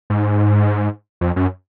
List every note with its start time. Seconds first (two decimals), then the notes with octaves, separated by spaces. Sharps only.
0.10 G#2
1.21 F2
1.36 F#2